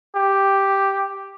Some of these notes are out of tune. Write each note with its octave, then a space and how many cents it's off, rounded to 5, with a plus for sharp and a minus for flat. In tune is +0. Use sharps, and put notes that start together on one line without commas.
G4 +0